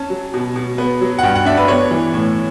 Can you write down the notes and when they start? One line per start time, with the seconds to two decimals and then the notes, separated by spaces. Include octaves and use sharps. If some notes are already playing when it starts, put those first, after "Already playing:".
Already playing: C#4 A5
0.10 F#3
0.34 B2
0.56 B2
0.78 B3
1.01 F#3
1.19 F#5
1.23 G2 G5
1.35 F#5
1.45 D4 E5
1.57 B4
1.68 B3 C#5
1.91 E3
2.14 A2